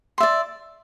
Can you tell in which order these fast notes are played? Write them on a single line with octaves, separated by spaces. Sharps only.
C6 E5 D5